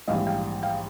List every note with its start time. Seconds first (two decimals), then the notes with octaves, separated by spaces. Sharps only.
0.08 A#1 G#2 E3 G3 D#5 F5
0.27 F5 G5
0.63 F5 G5